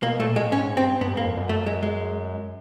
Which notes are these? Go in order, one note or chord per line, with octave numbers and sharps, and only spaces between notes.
B2 A#3
A#2 A3
A2 G#3
G#2 C#4
G2 C4
G2 B3
G#2 A#3
F2
F#2
A3
G#3
G#3